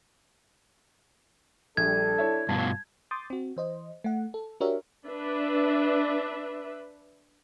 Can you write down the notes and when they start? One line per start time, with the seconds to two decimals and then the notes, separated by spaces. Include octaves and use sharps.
1.77 A#1 G3 D4 A4 G#6
2.18 E4 C#5 E5
2.49 G2 B2 F4 A5
3.11 C6 D6 D#6 G6 A6
3.30 C4 F#4
3.57 E3 C5 D#5
4.04 A3 F#5
4.34 A4
4.60 D4 F#4 G4 A#4 C#5 E5
5.07 D4 B4 E5